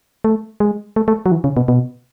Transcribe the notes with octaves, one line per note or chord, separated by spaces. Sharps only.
A3
G#3
A3
A3
F#3
E3
C#3
B2
B2